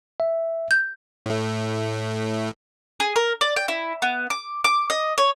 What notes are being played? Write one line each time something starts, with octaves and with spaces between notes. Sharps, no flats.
E5
G6
A2 A3
G#4
A#4
D5
G5
E4
B3
D6
D6
D#5
C#5